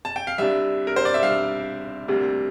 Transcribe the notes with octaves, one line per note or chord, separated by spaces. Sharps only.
A5
G5
F5
C2 C3 G3 D4 E5
A#4
C5
D5
E5
C2 C3 G3 D4 F5
D2 C3 G3 A#3 D4